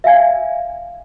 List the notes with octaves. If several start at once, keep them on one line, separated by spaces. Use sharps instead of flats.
E5 F5 G#5 G#6